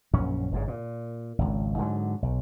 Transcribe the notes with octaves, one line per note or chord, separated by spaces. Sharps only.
A#1 F#2 C#4
G1 G#2 C#3
A#2
G#1 C#2
G#2 D3 E3 F#3
B1